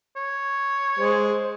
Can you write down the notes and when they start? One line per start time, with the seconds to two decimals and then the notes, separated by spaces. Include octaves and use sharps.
0.16 C#5
0.99 G#3 C5